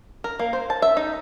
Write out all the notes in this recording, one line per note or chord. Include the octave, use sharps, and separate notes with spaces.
A#4
A#3
C5
A5
E5
D#4